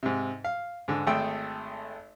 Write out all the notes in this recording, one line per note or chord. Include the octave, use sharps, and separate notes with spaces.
G#2 C3
F5
G#2 D3
G#1 A3 G#4 A4 G5 E6